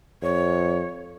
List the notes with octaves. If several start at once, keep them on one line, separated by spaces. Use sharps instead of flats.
F2 C#5